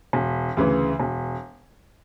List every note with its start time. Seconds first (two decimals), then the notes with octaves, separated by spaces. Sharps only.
0.13 E1
0.57 D2 C#3 E3
1.00 E1